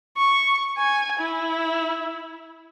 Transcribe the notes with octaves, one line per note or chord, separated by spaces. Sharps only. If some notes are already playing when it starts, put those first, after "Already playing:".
C#6
G#5
E4